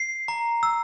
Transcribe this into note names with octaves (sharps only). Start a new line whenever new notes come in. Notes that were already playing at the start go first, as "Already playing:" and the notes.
Already playing: C7
A#5
E6